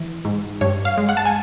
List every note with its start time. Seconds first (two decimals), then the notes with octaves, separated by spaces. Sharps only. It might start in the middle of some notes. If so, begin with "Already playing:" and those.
Already playing: E3
0.25 G#2
0.61 G2 C#5
0.85 F5
0.97 G#3
1.09 F#5
1.17 A5
1.26 G#5